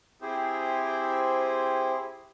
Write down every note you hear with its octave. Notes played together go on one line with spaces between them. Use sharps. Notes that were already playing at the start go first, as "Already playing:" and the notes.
C4 E4 G4 G#4 C5